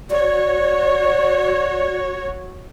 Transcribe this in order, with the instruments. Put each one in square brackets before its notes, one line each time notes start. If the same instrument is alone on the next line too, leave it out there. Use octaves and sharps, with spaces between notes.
[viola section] F#4 C#5 [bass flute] D5